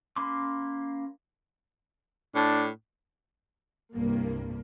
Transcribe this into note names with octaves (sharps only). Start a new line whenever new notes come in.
A#3 C#4 B5 C6 D6
A2 D4
C2 G2 A#3